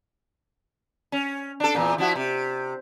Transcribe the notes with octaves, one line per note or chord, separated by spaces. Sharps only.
C#4
D4 A4
E2 A#2
F3 E4 F#4
C3